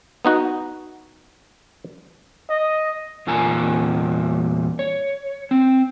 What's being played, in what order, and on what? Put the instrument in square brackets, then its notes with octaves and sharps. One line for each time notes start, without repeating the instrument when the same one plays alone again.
[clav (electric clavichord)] B3 D#4 F#4
[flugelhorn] D#5
[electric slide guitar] E2 A#2 F4 A#4 G#5 A#5
C#5
C4